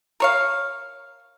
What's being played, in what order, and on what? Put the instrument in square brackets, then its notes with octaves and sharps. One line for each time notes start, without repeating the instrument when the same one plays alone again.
[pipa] A#4 C#5 F5